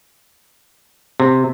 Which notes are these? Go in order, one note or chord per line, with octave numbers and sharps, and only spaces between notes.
C3